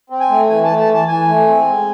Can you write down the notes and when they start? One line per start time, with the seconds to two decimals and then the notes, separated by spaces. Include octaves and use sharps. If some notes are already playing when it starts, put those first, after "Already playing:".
0.10 C4
0.20 G#5
0.30 A3
0.49 E3 G#5
0.64 A5
0.69 A3
0.79 A5
0.89 E3
0.94 A5
1.08 E3 G#5
1.28 A3
1.47 C4
1.67 G#3